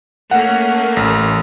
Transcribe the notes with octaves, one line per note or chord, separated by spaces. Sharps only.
A3 A#3 C#4 F#5
A1